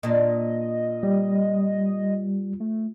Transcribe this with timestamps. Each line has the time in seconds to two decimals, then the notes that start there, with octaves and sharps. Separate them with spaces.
0.03 A#2 D4 D#5
1.03 G3
2.60 A3